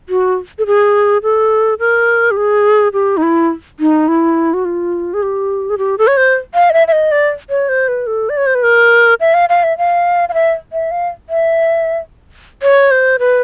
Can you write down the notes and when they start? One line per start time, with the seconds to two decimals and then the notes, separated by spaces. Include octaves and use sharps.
0.09 F#4
0.59 A4
0.66 G#4
1.23 A4
1.79 A#4
2.31 G4
2.37 G#4
2.93 G4
3.17 D#4
3.23 E4
3.80 D#4
4.08 E4
4.54 F#4
4.65 F4
5.14 G#4
5.22 G4
5.70 G#4
5.78 G4
5.98 A4
6.07 C#5
6.17 C5
6.55 F5
6.70 D#5
6.73 E5
6.88 E5
6.92 D#5
7.12 D5
7.50 C#5
7.69 C5
7.88 B4
8.07 A4
8.29 D5
8.37 C#5
8.46 C5
8.55 B4
8.63 A#4
9.20 E5
9.34 F5
9.49 F5
9.64 E5
9.78 F5
10.29 F5
10.34 E5
10.73 E5
10.91 F5
11.29 E5
12.63 C#5
12.91 C5
13.19 B4